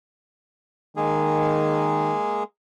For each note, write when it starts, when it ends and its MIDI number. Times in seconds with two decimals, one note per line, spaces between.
0.97 2.14 51
0.97 2.44 56
0.97 2.44 58
0.97 2.44 68